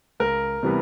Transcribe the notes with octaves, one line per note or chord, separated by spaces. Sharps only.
C#2 A#4
C3 E3 G3 B3